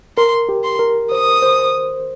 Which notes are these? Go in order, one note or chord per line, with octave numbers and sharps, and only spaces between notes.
A#4 C6
G4
C6
A#4
C5 D#6
C5